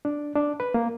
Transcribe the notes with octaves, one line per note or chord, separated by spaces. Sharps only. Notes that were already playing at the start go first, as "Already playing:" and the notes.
D4
D4
B4
A#3